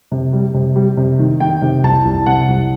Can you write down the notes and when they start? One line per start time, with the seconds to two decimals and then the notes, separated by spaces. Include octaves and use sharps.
0.12 C3
0.33 G3
0.54 C3
0.76 G3
0.97 C3
1.19 D#3
1.40 D#3 G5
1.62 C3
1.83 C2 A5
2.05 C2
2.26 C3 F#5
2.48 C2